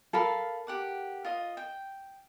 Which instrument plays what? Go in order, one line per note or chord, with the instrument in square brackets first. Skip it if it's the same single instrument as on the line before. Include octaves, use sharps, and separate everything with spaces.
[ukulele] A4 A#4 [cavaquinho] F5 A5 B5
[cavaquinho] G4 F#5 D6
F4 D#5
G5